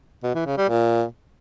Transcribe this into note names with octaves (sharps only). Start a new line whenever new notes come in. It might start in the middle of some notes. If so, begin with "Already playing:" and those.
B2
E3
C#3
G3
A#2